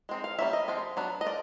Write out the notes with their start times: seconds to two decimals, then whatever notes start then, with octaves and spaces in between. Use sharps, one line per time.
0.09 G#3 C4 D#4
0.24 F5
0.39 G3 A#3 C#4 E5
0.53 D#5
0.68 F3 G#3 C4
0.97 F#3 B3 D4
1.21 D#5
1.26 F3 D5